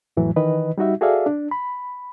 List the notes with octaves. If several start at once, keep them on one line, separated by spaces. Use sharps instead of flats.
F2 A2 E3 F#3
D#3 E3 B4 D#5
G3 D#4 F#4 E5
F#4 G#4 A4 D5 E5 F5
D4
B5